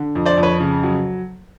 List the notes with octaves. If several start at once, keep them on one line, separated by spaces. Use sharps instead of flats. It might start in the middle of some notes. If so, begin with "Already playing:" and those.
Already playing: D3
F2
C5 D5
F2
B4 C#5
C#3
F#3